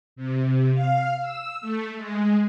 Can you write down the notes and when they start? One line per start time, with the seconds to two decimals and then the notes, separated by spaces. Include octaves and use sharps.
0.16 C3
0.73 F5
1.21 E6
1.61 A3
1.97 G#3